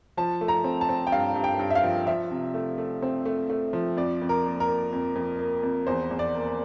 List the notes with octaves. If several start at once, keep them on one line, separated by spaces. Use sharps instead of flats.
F3 A5
A3
A#5
C4
A5
C4
G5
G2 F5
G2
G5
G2
E5
F5
F3
F3 E5
C3
A3
A3
C4
A3
A3
F3
F2 D5
F2
A#4
A#3
A#4
A#3
F2
F2
A#3
F2
E2 C5
E2
D5
A#3